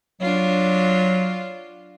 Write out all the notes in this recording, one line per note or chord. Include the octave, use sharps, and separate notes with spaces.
F#3 D4 F4